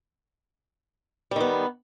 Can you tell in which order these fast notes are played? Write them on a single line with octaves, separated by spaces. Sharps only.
G3 D#3 B3